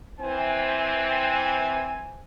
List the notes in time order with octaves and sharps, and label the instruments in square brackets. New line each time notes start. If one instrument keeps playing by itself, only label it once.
[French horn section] E3 C4 [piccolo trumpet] G#5